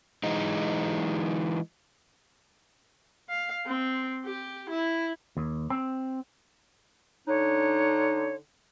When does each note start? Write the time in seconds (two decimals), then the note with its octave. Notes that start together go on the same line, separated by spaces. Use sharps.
0.23 E3 G#3 D#4
3.29 F5
3.66 C4
4.25 G4
4.69 E4
5.37 D#2
5.70 C4
7.28 D3 D4 D#4 C#5